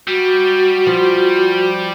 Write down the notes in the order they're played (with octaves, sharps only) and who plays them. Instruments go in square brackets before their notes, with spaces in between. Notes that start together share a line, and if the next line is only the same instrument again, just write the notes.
[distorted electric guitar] G3 [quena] F#4
[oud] F3